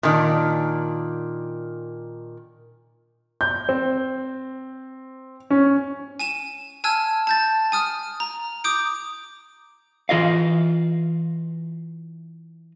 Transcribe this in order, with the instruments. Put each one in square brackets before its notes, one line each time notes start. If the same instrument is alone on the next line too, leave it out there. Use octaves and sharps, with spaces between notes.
[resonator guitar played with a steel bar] A#2 D#3 D4
[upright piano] G6
C4
C#4
[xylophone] G#5 D#7 E7
G#5 A5 E6 F6 G#6
A5 G6 A6
G#5 D#6 F6
A#5
D6 D#6 G6 D7
[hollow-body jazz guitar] E3 F4 D#5 F5